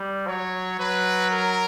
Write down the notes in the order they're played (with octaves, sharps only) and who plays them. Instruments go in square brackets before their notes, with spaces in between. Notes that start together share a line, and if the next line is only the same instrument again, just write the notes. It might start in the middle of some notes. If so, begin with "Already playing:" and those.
Already playing: [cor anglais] G3
[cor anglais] F#3 [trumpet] C#5
[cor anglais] F#3 [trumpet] B4
[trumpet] A#4